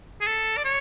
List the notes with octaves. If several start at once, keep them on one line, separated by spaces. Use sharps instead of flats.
G#4
A4
D5
C#5